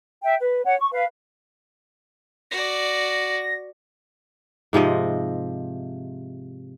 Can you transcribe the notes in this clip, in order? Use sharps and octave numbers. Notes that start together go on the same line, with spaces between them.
E5 G5
B4
C#5 F#5
C#6
B4 F5
F#4 D5 A#6
G#2 C3 F3 D#5